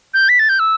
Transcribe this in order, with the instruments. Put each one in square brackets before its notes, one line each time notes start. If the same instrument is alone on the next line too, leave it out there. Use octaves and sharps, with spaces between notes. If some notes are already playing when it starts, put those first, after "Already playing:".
[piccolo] G6
B6
A6
G6
E6